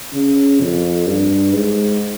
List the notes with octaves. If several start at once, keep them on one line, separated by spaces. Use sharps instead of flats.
C#3
F2
G2
G#2